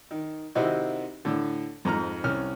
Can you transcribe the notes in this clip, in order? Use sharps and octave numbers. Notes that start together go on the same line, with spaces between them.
D#3
C3 D#3 C4 D#4 E4 F#4
A2 D3
F2 G#2 A#5 F6
C2 C#4 F6